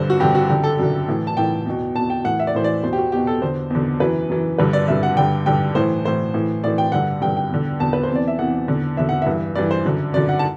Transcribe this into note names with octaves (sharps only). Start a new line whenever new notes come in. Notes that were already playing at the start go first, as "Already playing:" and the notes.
Already playing: G2 D3 C5
F#4
G2 D3 G4
F#4
F#2 D3 G4
A4
F#2 D3
A2 E3
A5
A2 E3 G5
E2 B2
E2 B2 A5
G5
A2 E3 F#5
E5
D5
A2 E3 C5
D5
E2 B2 C5
G4
F#4
E2 B2 G4
A4
E2 D3 C5
E2 D3
F#2 E3 B4
F#2 E3
G2 D3 B4
D5
G2 D3 E5
F#5
G2 D3 G5
G2 D3 G5
A2 E3 C5
A2 E3 C5
A2 E3
A2 E3 D5
G5
G2 D3 F#5
G2 D3 G5
G5
E2 D3
E2 D3 A5
B4
C5
E2 C3 E3
D5
E5
E2 C3 E3 F#5
E2 D3
E2 D3 E5
F#5
G2 E3 E5
G2 E3 D5
C5
F#2 D3
F#2 D3 D5
F#5
A5